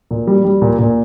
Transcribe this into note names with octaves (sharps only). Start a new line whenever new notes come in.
A#2
G3
G3
A#2
A#2